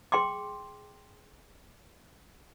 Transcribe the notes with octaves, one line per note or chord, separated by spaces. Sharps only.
G#4 G5 C6 D6